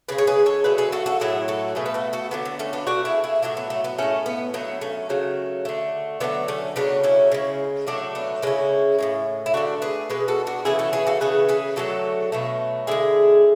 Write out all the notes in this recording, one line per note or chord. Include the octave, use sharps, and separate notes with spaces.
C#3 G#3 G#4 B4
C#5
G#4 B4
A4 C#5
D3 F#3 A3 G#4 B4
G#4 B4
F#4 A4
F#4 A4
A2 F#3 A3 E4 G#4
F#4 A4
B2 A3 G#4 B4
B4
F#4 A4
F#4 A4
D3 F#3 A3 B3
B3
A3 C#4
B3 D4
B2 A3 D4 F#4
E4 G#4
E4 G#4
A2 F#3 A3 D4 F#4
B3
A3
B3
A2 G#3 A3 C#4
B3
D3 F#3 A3 B3
A3 C#4
C#3 F#3 A3
D3 A3
D3 F#3 A3 B3
A3 C#4
C#3 F#3 A3 B3 D4
C#4 E4
C#3 G#3
A2 F#3 A3 D4 F#4
B3 D4
C#3 G#3 C#4 E4
A2 E3 G#3
E4
D3 A3 D4 F#4
G#4 B4
B2 G#3 G#4 B4
F#4 A4
D4 F#4
C#3 E3 A3 E4 G#4
F#4 A4
G#4 B4
F#4 A4
C#3 E3 A3 G#4 B4
G#4 B4
D3 F#3 A3 F#4 A4
B2 F#3 A3
D3 G#3 E4 G#4